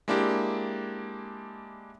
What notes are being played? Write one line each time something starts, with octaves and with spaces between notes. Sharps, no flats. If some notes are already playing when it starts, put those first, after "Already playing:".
G#3 A#3 D4 E4 G4